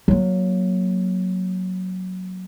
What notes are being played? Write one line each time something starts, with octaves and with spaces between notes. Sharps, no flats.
F#3 A#3